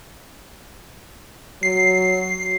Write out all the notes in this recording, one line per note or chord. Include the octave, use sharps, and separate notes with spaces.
F#3 C7